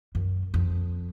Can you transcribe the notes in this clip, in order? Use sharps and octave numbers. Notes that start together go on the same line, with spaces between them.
F#2
F2